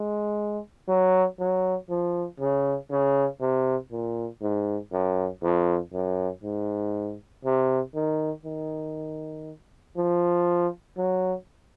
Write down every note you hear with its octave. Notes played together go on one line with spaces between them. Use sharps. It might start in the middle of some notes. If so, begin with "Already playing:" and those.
Already playing: G#3
F#3
F#3
F3
C#3
C#3
C3
A#2
G#2
F#2
F2
F#2
G#2
C3
D#3
D#3
F3
F#3